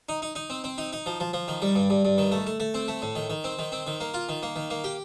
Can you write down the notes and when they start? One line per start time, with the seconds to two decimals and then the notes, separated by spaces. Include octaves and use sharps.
0.09 D#4
0.22 D#4
0.35 D#4
0.50 C4
0.64 C4
0.78 D#4
0.93 D#4
1.06 F3
1.20 F3
1.33 F3
1.48 D#3
1.62 G3
1.75 G2
1.90 G2
2.05 G2
2.18 D#3
2.32 A3
2.47 A3
2.60 A3
2.74 C4
2.88 A3
3.02 A2
3.15 D#3
3.30 D#3
3.44 C4
3.59 D#3
3.72 C4
3.87 D#3
4.00 A#3
4.14 F4
4.29 D#3
4.43 A#3
4.56 D#3
4.70 A#3
4.84 G4